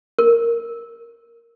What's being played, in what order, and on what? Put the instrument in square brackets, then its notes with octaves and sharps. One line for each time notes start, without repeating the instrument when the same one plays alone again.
[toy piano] A#4